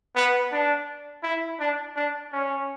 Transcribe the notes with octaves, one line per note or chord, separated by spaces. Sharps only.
B3
D4
E4
D4
D4
C#4